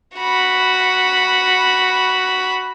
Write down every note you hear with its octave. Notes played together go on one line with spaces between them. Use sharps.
F#4 B5